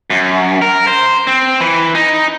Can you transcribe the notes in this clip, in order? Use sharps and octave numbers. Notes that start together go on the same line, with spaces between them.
F#2
A#4
C5
C4
E3
D#4